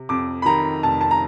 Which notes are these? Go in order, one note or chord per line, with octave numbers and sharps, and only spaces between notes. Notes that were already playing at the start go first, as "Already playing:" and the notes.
Already playing: C3
F2 D6
B5
D#3 A#5
F1 A5
A5
A#5